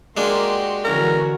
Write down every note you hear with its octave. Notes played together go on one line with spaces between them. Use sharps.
G#3 A#3 D4 F#4 G4 A#4 C6
D3 E3 C#4 F#4 A#4